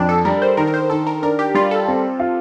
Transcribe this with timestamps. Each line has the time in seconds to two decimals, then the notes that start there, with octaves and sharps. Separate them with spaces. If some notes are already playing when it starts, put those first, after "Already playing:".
Already playing: F2 D4
0.09 A4
0.25 G3 A#4
0.42 C5
0.57 D#3 A#4
0.67 A#4
0.74 C5
0.90 D#3 A4
1.07 A#4
1.23 D4 A#4
1.39 G4
1.55 G3 F4
1.71 A4
1.88 C4
2.19 F4